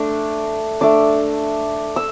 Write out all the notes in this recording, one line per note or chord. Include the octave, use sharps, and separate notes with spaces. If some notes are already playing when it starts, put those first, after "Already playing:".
Already playing: A3 D4 D6
A3 D4 D6
E6